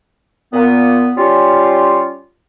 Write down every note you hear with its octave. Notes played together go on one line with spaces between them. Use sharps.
A#2 B3
G3 C#4 F4